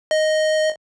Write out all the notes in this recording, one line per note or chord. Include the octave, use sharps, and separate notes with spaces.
D#5